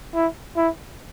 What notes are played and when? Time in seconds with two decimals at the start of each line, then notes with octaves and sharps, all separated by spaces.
0.15 E4
0.56 E4